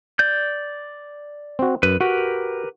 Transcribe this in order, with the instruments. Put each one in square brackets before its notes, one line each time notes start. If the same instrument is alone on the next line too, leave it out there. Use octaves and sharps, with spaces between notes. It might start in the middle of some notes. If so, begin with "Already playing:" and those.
[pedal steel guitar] D5 G6
[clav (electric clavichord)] C4 F#4
[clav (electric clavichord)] F#2 [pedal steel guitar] B4
[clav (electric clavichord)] F#4 [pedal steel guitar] G4 A#4 B4